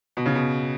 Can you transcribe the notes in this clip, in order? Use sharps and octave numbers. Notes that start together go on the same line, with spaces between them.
B2
C#3
B2